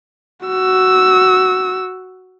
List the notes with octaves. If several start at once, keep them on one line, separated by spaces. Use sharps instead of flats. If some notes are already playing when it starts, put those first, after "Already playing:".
F#4 E6